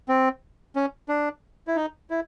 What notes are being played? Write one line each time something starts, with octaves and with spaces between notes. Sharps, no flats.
C4
C#4
D4
E4
D#4
E4